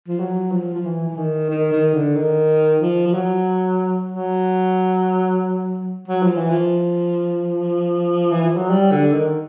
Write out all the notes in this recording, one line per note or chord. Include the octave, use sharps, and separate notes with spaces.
F3
F#3
F3
F3
E3
E3
D#3
D#3
D#3
D3
D#3
F3
F3
F#3
F#3
F#3
F3
E3
F3
E3
F3
F#3
G3
D3
D#3